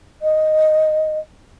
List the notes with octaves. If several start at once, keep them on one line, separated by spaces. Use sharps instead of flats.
D#5